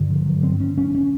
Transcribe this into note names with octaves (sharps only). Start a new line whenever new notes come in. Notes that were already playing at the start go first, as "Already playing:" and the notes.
Already playing: G2 D3
F3
F#3
C4
C#4
C#4
C#4